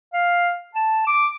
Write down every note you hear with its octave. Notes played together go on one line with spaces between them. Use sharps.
F5
A5
D6